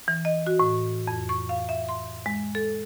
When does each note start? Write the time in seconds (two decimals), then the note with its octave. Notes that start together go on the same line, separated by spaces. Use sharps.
0.08 E3
0.25 D#5
0.46 F#4
0.60 A2
1.07 F2
1.29 C#6
1.49 F5
1.69 E5
1.89 C6
2.26 G#3
2.55 A4